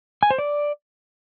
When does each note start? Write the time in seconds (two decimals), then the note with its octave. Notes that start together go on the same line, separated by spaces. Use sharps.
0.23 G#5
0.31 C5
0.38 D5